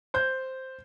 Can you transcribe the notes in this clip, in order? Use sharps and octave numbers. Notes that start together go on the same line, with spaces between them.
C5 G6